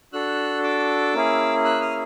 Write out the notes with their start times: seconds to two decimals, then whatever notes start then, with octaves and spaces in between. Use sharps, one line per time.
0.13 D4 F#4 A4 E6 F#6
0.63 D6 E6
1.14 A#3 C#4 E4 G#4
1.64 E6 F#6
1.81 D#6 F6